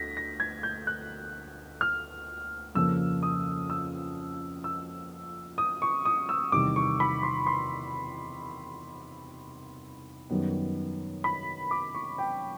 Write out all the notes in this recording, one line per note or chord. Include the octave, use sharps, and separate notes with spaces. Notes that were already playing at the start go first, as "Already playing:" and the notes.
Already playing: D2 A#6 B6
A#6
G#6
G6
F#6
F6
F2 C#3 F3 A#3 E6
D#6
E6
E6
D#6
C#6
D#6
E6
E2 C3 D#3 G3 D6
C#6
B5
C6
C6
F#2 D#3 G3 B3
B5
D6
C#6
G5